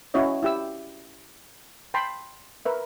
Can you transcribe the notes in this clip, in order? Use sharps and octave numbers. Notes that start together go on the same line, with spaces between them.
C#4 E4 F#4 C#5 D#5
E4 G4 E6
G5 A5 B5 C6
A#4 B4 E5